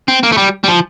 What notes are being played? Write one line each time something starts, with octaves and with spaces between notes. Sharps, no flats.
C4
A#3
A3
G3
G3
F3